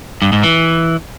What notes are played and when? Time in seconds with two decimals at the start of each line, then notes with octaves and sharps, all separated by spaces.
0.22 G2
0.33 G#2
0.43 E3